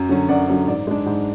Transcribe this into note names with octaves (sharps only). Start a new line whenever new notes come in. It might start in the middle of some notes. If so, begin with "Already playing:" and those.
Already playing: F#2
D3 F#3 C#4
F#2 D5 F#5
D3 F#3 C#4
G#2 D5
G#3 D4
G#2